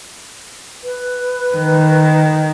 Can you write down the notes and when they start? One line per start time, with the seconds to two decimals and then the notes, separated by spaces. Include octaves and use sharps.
0.84 B4
1.55 D#3